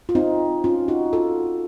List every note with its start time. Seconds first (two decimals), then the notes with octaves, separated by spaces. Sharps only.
0.09 F4
0.15 C4 D#4
0.64 C#4 F4
0.88 D#4 F#4
1.13 F4 A4